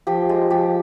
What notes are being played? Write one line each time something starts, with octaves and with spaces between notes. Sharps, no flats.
F3 G4
G#3
F3 G4